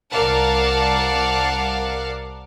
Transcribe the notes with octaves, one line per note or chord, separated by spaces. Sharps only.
C2 A#4 D5 F5 F#5 A5